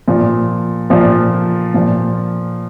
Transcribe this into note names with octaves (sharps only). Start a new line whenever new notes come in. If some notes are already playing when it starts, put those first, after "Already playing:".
A#2 F3
A#2 F3
A#2 F3